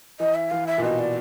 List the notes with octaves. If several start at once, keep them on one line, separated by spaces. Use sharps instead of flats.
E3 D#5
E5
E3 F5
E5
A#2
B2 D#5
D5